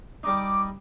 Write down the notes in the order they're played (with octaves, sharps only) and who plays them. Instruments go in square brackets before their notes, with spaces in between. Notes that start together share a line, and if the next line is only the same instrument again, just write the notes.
[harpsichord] G3 D#4 [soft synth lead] D6